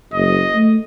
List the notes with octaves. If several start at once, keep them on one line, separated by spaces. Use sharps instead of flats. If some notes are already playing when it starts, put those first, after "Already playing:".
F#1 D#5
A3